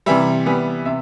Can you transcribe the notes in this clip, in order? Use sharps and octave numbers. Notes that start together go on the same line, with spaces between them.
C3 E3 G3 E5
E3 G3 B3
C3 E5